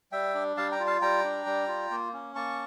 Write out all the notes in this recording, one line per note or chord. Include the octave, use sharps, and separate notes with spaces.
G3 E5 G5
D4
G3 F5 A5
G5 A#5
F4
F5 A5
G3 G5 A#5
D4
G3
F4
A#3
C#4
A#3 A5 C#6